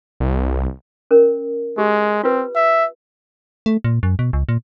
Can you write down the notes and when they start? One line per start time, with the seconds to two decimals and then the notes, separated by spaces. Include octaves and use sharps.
0.20 C2
1.11 C#4 A#4
1.78 G#3 G4
2.24 C4 F4 B4
2.55 E5
3.66 A3
3.84 A#2
4.03 F#2
4.19 B2
4.33 C#2
4.49 A#2